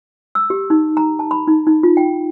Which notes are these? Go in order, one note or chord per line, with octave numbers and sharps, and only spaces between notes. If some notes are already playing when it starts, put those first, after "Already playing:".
E6
G4
D#4
A#5
A5
B5
D#4
D#4
F4
G5